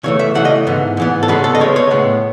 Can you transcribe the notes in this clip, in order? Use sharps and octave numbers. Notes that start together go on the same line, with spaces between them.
C#3 E3 A3 C#5
E5
C#3 E3 A3 F#5
D#5
G#2 E3 B3
G#2 E3 B3
A4
C#3 G#3 B3 B4
A4
D#5
C#3 G#3 B3 C#5
C#5
A2 G#3 B3